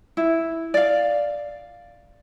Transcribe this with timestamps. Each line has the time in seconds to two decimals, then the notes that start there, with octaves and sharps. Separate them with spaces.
0.17 E4
0.74 D5 F5